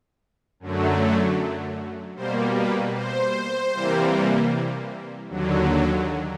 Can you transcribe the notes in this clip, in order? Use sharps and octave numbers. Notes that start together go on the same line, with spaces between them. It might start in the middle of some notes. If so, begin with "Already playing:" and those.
F#2 D3 F#3 A3
B2 G3 A#3 C5
B4
C5
C3 E3 G3 A#3
D#2 D3 F#3